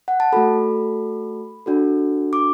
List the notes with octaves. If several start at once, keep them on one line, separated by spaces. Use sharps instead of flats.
F#5
A5
A3 F#4 A4 B5
D4 F#4 A4
D6